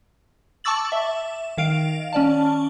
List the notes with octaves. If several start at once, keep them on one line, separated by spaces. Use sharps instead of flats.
A5 C#6 D6 E6 A6 F#7
E5
D#3 F5 D7
C#4 D5 A5